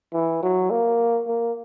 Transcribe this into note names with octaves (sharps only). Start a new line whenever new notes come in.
E3
F#3
A#3
A#3